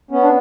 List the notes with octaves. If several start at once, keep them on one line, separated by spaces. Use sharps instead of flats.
B3 C#4
D4